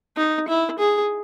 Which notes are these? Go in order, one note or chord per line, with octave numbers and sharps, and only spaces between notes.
D#4
E4
G#4